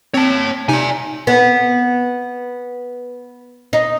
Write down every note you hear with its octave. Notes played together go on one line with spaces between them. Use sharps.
C4 C#5 A5
C3 D#4 D5 G#5
B3
D#4